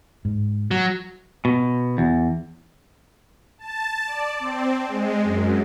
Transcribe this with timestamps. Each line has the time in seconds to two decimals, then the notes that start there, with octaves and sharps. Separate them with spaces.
0.25 G#2
0.71 F#3
1.45 B2
1.98 E2
3.58 A5
4.05 D5
4.40 C4
4.88 G#3
5.24 F#2